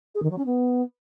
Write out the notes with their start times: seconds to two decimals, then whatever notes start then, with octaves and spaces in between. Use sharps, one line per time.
0.15 G#4
0.22 D#3
0.30 F#3
0.38 C#4
0.45 B3